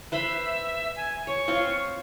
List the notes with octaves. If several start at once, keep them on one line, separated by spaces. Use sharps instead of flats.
B4 C5 E5 B5
G#5
C#5 C#6
C4 F4 C#5